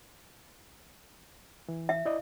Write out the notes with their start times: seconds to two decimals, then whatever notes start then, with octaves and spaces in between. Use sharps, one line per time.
1.69 E3
1.89 E5
2.06 E4 D5 D#5